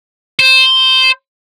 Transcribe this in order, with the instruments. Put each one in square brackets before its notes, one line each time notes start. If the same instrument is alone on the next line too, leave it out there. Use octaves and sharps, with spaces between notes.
[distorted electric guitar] C5